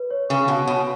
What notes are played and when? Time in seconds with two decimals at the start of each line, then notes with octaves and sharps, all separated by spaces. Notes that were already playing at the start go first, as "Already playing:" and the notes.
Already playing: B4
0.10 C#5
0.29 C#3 C#6
0.48 B2 F#5
0.67 B2 C#5